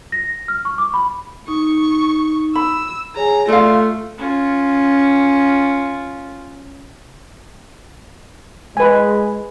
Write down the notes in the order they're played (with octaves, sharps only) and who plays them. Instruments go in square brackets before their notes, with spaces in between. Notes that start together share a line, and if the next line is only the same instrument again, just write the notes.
[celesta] A#6
F6
C#6
D6
B5
[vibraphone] D#4 [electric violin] C#6
[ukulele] B5 [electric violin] E6
[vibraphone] G#4 C#5 G#5 [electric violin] A#5
[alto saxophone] A3 [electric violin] F4 [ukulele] D5 F5 [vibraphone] C6
[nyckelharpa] C#4 F4
[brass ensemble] G#3 [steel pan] B4 G#5